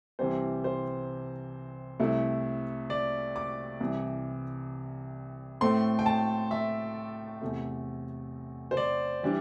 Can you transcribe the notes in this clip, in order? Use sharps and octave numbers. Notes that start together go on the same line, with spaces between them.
C2 C3 E3 G3 C4 C5
C5
C2 C3 A3 E4
D5
D6
C2 C3 E3
A2 A3 C4 C6
G5
A5
E5
E2 C3 A3
C5
D5
E3 G3 D4